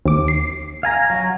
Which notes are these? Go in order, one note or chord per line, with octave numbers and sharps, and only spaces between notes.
D#2 D6
C7
F5 G#5 A#5
F#3